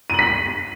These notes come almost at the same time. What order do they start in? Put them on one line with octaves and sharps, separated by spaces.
D#7 F#7 B6